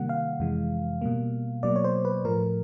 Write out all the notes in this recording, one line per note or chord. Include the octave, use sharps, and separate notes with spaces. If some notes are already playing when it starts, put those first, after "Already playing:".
Already playing: C3 D#3 G3 A#3 F#5
F5
F2 C3 E3 G#3
B2 G3 A#3
B2 F#3 A#3 D5
C#5
C5
B4
A2 F3 A3 A#4